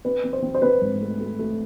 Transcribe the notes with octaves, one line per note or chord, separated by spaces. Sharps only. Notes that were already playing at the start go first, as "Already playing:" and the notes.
C4 B4
C4
C5
C4
C5
C4 B4
G#2
A3
A3
A3